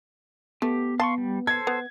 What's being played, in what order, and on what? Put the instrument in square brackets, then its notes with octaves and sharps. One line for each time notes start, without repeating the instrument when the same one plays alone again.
[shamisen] A3 [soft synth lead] B3 [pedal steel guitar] G4
[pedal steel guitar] F5 C6 C#6 [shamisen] A5
[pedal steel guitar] G3
[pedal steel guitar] A4 C5 [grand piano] G#6
[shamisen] B3